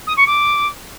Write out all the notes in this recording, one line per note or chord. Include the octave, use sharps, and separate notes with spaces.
D#6
C#6
D6